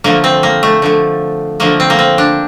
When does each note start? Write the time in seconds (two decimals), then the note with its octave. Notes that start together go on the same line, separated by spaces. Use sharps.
0.04 D3 F3 A3 A#3
0.24 C4
0.43 A#3
0.63 A3
0.82 D3 F3 A3
1.60 D3 F3 A3 A#3
1.80 C4
1.90 A#3
1.99 C4
2.18 D4